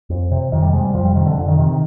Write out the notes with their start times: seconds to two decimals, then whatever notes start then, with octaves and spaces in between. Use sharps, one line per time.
0.10 F2
0.31 C3
0.52 F2 D#3
0.62 G3
0.73 C3 G#3
0.84 G3
0.94 F2 F3
1.05 G3
1.15 C3 D#3
1.26 D3
1.38 F2 D3
1.48 D#3
1.59 C3 D#3
1.69 D#3